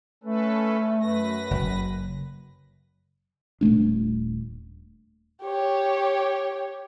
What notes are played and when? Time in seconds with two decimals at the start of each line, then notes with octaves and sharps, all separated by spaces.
0.24 A3 C#4 A4 B4
1.01 F#2 B4 A#6
1.51 F#1
3.61 D#1 A#2 A3 D4
5.42 G4 C#5